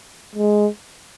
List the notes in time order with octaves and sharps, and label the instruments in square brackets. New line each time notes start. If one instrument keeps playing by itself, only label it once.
[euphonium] G#3